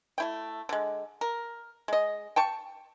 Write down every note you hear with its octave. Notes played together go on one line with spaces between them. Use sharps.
A3 E4 G5
D3 G#3
A#4
G#3 D#5
G5 A5 C#6